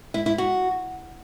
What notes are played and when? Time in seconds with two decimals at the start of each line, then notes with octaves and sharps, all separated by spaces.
0.14 E4
0.26 E4
0.38 F#4